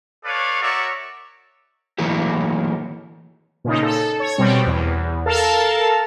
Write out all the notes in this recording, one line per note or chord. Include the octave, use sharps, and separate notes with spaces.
A4 B4 C#5 D5 F5
F#4 A#4 C#5 D5 E5
E3 F#3 A3 A#3 E4 G4
A#2 C#3 D#4
A4
C#5
B2 G3 C4
E2
A4 A#4 F5 A5